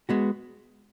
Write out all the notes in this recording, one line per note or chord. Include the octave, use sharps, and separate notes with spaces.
G#3 B3 F#4